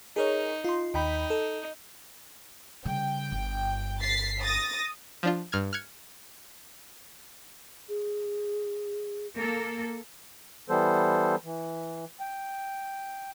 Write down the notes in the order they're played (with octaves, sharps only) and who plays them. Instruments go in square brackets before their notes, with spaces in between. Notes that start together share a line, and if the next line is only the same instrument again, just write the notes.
[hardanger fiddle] D#4 [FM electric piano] G#4 A#4 C#5
[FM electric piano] F4 C6
[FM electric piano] D#2 G5 B5 [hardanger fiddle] D#4
[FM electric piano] A4
[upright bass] C#3 G3 [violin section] G5
[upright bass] G1
[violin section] A6 B6 C7
D#6 A6 A#6
[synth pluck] F3 D4 F4
G2 F6 G#6
F6 F#6 G#6 C#7
[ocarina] G#4
[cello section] A#3 A4
[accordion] E3 G3 B3 A4 C5
E3
G5